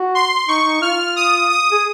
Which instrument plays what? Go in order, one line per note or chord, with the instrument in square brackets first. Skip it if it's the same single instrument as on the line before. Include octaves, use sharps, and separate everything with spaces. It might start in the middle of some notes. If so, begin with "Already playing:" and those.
Already playing: [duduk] F#4
[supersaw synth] C6
[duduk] D#4 [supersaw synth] C#6
[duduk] D#4
[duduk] F4 [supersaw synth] F6
[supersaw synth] D#6
D#6
[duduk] G#4